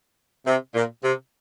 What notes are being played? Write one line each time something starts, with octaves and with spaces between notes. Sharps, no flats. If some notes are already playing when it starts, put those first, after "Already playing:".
C3
A#2
C3